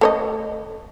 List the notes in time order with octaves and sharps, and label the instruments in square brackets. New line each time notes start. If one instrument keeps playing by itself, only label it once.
[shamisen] A3 C#5 D#5